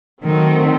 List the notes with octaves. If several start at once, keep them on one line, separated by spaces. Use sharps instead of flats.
D#3 F#3 A3 C4